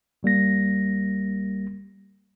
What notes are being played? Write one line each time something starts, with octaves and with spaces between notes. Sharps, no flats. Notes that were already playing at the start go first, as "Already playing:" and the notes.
A1 G3 A#3 A#6